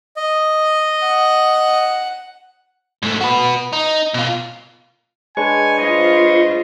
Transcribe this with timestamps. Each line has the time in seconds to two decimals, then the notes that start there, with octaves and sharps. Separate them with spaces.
0.17 D#5
1.06 F#5
3.03 G#2 A3
3.21 F#4 B4
3.73 D#4
4.14 B2 F4
5.37 G#3 D4 B4 C#5 G#5 C#6
5.78 F4 C5 D#5